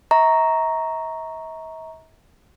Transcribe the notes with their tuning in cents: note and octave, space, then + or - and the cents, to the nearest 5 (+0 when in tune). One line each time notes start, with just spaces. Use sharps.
E5 -45 A#5 +0 C#6 +0